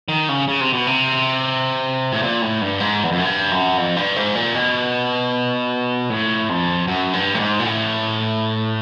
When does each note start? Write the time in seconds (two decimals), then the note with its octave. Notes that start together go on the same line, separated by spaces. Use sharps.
0.08 D#3
0.29 C#3
0.48 C#3
0.61 C3
0.73 B2
0.87 C3
2.12 A2
2.23 A#2
2.42 A2
2.62 G2
2.80 G#2
3.04 E2
3.12 F2
3.18 F#2
3.26 G2
3.51 F#2
3.77 F2
3.96 G2
4.16 G#2
4.35 A#2
4.55 B2
6.10 A2
6.49 F2
6.87 F#2
7.13 G2
7.34 A2
7.39 G#2
7.60 A#2
7.65 A2